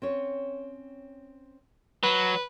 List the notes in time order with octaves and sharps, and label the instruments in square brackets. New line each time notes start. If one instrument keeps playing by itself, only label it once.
[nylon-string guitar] C4 C#4 C#5
[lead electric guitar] F#3 [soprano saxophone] B4